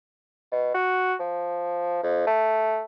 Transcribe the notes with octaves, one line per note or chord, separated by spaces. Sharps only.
B2
F#4
F3
F2
A3